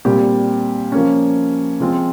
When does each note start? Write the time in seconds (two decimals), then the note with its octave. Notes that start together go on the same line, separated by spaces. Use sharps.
0.05 A#2 G3 C4 G4
0.92 F3 A#3 C#4
1.80 F3 G#3 C4 F4